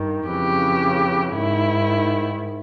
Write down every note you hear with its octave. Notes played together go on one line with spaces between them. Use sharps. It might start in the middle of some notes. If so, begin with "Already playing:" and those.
Already playing: G2 D#3
F2 C#3 E3 G4
G#2 D#3 E4